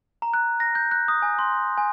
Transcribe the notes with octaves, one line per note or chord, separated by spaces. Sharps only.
A#5
F#6
A#6
G6
F#6
D#6
G#5
C6
G#5